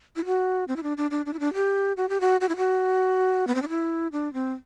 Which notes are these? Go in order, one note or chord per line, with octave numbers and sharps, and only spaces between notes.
E4
F#4
C4
E4
D4
D4
D4
D4
E4
D4
G4
F#4
G4
F#4
F#4
E4
F#4
B3
C4
D4
E4
D4
C4